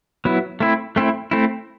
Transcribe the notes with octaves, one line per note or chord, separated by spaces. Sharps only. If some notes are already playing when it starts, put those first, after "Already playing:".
F#3 B3 E4
A3 C4 E4
A3 C4 E4
A3 C4 E4